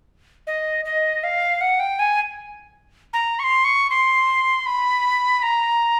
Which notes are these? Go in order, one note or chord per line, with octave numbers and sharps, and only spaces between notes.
D#5
D#5
F5
F#5
G5
G#5
A#5
C#6
C6
C#6
C6
B5
A#5